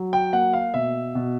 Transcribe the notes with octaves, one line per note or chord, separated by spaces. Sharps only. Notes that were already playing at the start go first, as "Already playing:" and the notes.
Already playing: F#3
G5
A#3 F#5
F5
B2 E5
B2